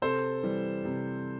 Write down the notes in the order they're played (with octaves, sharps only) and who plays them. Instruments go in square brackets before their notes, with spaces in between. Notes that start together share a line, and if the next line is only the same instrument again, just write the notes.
[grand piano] C3 A4 C5
E3 G3
C3